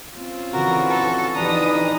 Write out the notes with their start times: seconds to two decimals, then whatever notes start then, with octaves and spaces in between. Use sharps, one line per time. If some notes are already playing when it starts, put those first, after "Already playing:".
0.13 C4 C#4 F4
0.53 D3 E3 F#4 A#4
0.89 A4
1.35 F2 E3 D4 D#4 G4 B4 A#5 D#6